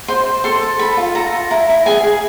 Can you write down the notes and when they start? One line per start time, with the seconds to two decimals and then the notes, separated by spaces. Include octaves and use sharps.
0.08 C5 C6
0.26 C5
0.44 A4 C6
0.63 A4
0.79 A4 B5
0.97 F4
1.15 A4 A#5
1.33 F4
1.50 E4 A#5
1.69 E4
1.86 G#4 G#5
2.03 G#4